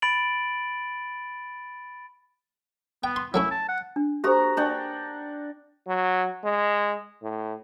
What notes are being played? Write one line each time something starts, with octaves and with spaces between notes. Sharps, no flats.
B5 A6 D7 F#7
B3 G5
C6
F#3 A3 C#4 E4
A5
F#5
D4
F#4 G4 A4 C5 A#5
D4 F#5 G5
F#3
G#3
A2